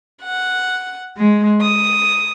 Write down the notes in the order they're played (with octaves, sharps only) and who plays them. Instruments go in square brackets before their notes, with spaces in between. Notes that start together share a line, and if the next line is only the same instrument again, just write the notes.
[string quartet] F#5
G#3
D#6